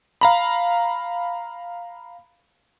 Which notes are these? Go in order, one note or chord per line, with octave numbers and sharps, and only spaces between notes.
F5 A#5 B5